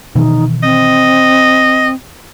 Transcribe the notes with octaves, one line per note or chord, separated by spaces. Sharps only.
B2 D#3 E3 D#4
C4 D#5